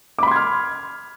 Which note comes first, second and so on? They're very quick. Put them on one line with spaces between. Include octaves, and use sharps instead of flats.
D6 B5 C6 G#6 F6